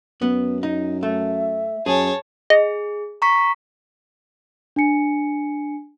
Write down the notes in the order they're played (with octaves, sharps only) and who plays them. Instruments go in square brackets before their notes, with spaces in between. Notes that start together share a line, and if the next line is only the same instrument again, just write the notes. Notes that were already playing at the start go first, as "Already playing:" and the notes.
[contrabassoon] F#2 [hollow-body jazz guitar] B3
[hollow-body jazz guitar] D#4
[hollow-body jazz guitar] A3 [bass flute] E5
[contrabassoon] F#2 [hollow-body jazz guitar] G#4 [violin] C#5 A5
[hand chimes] G#4 [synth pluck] D#5
[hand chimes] A#5 C#6 B6
[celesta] D4 G#5 C#7